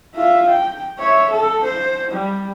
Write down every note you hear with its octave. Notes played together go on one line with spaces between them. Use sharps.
F4 E5
G5
C#5 E5
A4
C5
G3